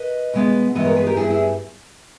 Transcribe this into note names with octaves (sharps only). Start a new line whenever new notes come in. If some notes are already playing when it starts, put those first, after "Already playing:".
Already playing: B4 D#5
B2 G#3 B3
G2 E3 G#3 B3 B4 D#5
A#4 C#5
G#4 B4
G4 A#4
G2 G3 B3 E4 G#4
E4 G#4